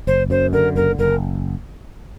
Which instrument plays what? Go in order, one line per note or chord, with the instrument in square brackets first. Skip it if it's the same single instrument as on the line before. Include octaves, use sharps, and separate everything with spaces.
[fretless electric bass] F#1 [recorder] C5
[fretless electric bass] F#2 [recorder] C5
[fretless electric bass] D3 [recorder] A#4
[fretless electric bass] F#1 [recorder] A#4
[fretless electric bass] F#1 [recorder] A#4